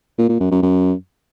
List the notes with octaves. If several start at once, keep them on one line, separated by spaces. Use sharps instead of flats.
A#2
A#2
F#2
F#2
F#2